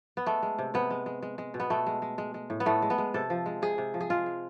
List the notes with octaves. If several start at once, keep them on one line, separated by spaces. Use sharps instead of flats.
B3
G#3 A3
G#3
C3
C3 B3
G#3
G#3
G#3
G#3
B2
B3
B2 A3
G#3
G#3
G#3
G#3
A2
B3
A2 A3
G#3
B3
G#3
C3 A4
F3
G#3
C3 G#4
C3
F3
G#4
G#3 F4
G#3